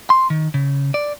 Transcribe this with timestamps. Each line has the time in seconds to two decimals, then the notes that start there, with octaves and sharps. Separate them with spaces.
0.10 C6
0.30 D#3
0.54 C#3
0.94 D5